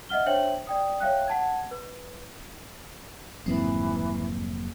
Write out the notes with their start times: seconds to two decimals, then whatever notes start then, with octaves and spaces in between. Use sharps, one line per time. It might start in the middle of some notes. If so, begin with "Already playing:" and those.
0.09 D#5 E5 F#5 F6 G7
0.26 D4 C5 C#5 E5 G5 F#7
0.67 D5 G5 D#6
1.00 C#5 E5 F5 G5 F#6
1.28 F#5 A5 G#6
1.71 B4
3.46 F1 G#2 D#3 E3 F#3 A#3 C4